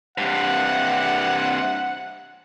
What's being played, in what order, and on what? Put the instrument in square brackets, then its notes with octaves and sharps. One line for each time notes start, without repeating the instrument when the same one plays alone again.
[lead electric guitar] G2 C3 [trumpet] F#5